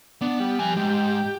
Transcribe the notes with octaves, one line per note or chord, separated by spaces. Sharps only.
B3 D4
G3
F3 G#5
G#2 G4